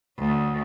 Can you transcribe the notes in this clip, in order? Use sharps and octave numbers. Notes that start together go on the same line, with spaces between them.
D2